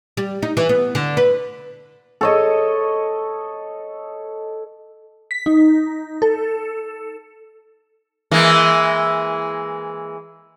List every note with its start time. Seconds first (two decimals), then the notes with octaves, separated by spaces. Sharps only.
0.17 G3
0.42 D#4
0.57 E3
0.69 B3
0.95 D3
1.17 B4
2.21 A4 C#5 D#5
5.31 B6
5.46 D#4
6.22 A4
8.31 E3 G#3 A#3